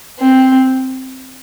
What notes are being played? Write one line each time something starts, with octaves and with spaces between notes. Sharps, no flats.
C4